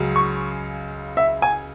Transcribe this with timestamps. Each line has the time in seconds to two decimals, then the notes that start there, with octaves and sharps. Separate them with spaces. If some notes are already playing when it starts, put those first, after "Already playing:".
Already playing: C#2 C#3 F#3
0.16 C#6
1.17 E5
1.42 G#5